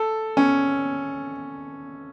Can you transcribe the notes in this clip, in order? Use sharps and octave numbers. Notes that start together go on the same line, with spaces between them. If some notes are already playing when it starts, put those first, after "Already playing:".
Already playing: A4
C#4